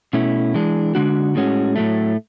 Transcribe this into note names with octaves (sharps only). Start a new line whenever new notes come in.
B2 A3 C#4 E4
E3 G#3 D4
D3 G#3 D4 F#4
A2 G#3 C#4 F#4
A2 F#3 A3